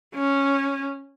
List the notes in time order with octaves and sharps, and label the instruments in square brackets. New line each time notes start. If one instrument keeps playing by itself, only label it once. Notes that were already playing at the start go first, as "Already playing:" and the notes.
[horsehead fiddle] C#4